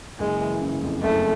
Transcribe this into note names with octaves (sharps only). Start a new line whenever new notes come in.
F#1 G#3
E3
C#3
F2
F#1 A3